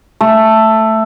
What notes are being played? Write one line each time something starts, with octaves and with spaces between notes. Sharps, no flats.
A3